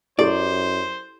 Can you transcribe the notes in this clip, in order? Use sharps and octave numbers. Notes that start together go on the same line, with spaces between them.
F#2 E4 G4 A4 C5 D5